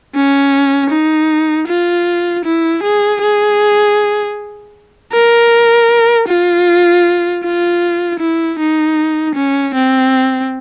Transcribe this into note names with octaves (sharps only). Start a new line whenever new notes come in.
C#4
D#4
F4
E4
G#4
G#4
A#4
F4
F4
E4
D#4
C#4
C4